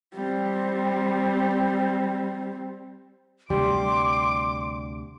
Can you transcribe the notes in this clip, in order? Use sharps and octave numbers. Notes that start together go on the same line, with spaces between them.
G3 C4
D2 C3 G3 C6 D6